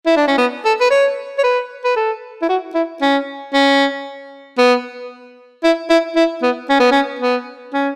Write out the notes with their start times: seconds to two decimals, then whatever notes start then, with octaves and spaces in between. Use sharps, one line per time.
0.06 E4
0.17 D4
0.28 C#4
0.38 B3
0.65 A4
0.81 B4
0.91 C#5
1.38 C#5
1.44 B4
1.84 B4
1.96 A4
2.42 E4
2.49 F#4
2.75 E4
3.02 C#4
3.54 C#4
4.58 B3
5.64 E4
5.90 E4
6.16 E4
6.43 B3
6.69 C#4
6.80 B3
6.91 C#4
7.21 B3
7.74 C#4